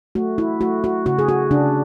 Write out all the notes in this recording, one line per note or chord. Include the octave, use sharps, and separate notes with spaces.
A3 F#4
E4
A3 F#4
F#4
C#3 F#4
G#4
F#4
C#3 D4